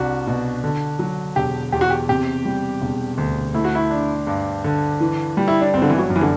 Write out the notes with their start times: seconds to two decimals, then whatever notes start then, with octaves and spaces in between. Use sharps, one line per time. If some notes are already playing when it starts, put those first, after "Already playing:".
Already playing: C2 D4 F#4
0.27 B2
0.64 D3
0.99 F#3
1.36 E1 G4
1.72 E2 G4
1.81 F#4
1.90 G4
2.09 C3 G4
2.45 G3
2.82 E1
3.18 D2
3.54 A3 E4
3.64 F#4
3.75 E4
3.90 D4
4.27 G2
4.64 D3
5.00 E3
5.37 G3
5.48 E4
5.61 D4
5.74 G1 C4
5.82 D3
5.90 E3
5.98 F#3
6.10 F#2
6.16 E3
6.21 D3